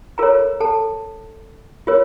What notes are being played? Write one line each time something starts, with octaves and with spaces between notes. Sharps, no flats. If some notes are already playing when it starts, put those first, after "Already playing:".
F4 A4 A#4 C#5 A#5
A4 A5
F4 A#4 C#5